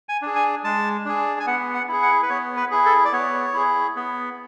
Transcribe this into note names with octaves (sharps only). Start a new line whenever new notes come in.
G#5
D4 G#4
G#5
G#3 A5
D4 G#4
G#5
B3 F#5
F#5
E4 G#4
F#5
B4
B3 C#5
B4
E4 G#4
A4
D5
B3 C#5
E4 G#4
B3